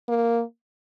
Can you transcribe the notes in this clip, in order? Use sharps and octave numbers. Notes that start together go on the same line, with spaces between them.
A#3